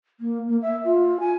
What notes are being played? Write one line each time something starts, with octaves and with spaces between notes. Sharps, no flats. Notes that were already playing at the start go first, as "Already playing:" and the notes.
A#3
A#3
E5
F4
G#5